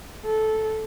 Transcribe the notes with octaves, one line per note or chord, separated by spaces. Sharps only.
A4